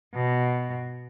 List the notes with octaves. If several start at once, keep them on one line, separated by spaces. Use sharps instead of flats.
B2